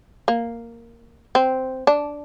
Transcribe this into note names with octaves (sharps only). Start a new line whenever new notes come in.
A#3
C4
D4